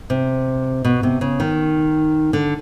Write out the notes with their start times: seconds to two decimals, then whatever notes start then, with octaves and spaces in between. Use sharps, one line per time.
0.10 C3
0.84 B2
1.03 C3
1.21 C#3
1.40 D#3
2.33 D3